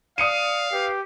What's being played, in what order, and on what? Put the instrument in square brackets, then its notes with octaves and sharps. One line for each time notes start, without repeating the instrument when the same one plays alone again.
[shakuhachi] D5 [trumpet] F5 [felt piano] D#6 C#7 D#7
[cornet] G4 [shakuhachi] B4